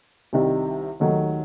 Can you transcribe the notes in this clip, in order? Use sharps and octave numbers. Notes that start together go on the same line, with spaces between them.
C2 C3 D#3 G3
D#2 D#3 F#3 A3 D#4